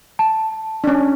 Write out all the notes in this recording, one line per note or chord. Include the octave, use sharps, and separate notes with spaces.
A5
C#4 D4